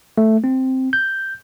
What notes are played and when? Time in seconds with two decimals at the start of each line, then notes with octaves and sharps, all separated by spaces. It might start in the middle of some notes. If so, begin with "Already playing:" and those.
0.18 A3
0.44 C4
0.93 G6